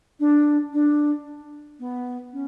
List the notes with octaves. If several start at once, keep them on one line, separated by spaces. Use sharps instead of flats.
D4
D4
B3
C#4